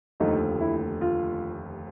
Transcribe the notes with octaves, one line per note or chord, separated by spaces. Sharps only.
F1 D#2 D3 F3 A3 D#4
E4
F4